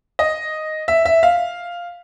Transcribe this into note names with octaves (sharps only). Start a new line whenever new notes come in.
D#5
E5
E5
F5